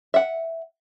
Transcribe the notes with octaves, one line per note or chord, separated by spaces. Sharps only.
E5 F#5